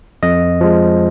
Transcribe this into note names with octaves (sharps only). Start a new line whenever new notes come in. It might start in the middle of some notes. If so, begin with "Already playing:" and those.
F2 D#5
F3 G#3